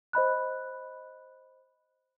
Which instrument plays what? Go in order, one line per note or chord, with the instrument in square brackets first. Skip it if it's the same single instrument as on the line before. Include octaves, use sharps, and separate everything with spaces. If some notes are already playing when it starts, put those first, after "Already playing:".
[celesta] C5 D#5 B5 F#6